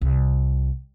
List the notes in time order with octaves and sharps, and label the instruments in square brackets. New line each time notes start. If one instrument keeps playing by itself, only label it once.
[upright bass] C2